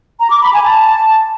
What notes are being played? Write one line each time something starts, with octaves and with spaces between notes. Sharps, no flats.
A#5
D6
B5
G#5
A5